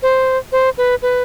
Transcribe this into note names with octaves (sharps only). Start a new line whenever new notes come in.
C5
C5
B4
B4